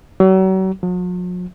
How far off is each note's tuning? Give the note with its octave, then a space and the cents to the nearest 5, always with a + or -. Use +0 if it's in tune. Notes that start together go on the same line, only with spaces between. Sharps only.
F#3 +40
F#3 -45